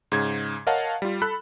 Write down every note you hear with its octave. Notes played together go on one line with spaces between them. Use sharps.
G#2 C#3 G#6
A#4 C#5 D#5 F5 F#5 A5
G3 F4
A4 B5 F#6